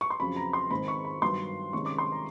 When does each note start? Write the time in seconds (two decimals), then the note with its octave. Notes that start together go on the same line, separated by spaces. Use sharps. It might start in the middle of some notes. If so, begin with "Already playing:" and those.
0.01 C#6
0.10 C6
0.20 F2 C#3 F#3 B5
0.36 A#5
0.53 C6
0.71 G#2 D#3 G#3 C4 B5
0.88 C#6
1.05 B5
1.22 G2 D#3 F#3 B3 C6
1.73 C3 D#3 G#3 C#4 C#6
1.86 D6
1.98 C6
2.12 A#5